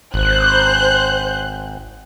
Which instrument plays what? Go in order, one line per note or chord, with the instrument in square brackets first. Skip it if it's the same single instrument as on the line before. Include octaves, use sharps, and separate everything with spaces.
[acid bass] G#1 [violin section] C5 F#6 G6